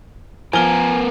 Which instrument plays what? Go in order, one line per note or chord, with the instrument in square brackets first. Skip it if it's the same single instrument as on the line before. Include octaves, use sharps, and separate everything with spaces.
[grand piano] F3 F6 G7 [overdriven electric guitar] B3 A#4 [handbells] G#5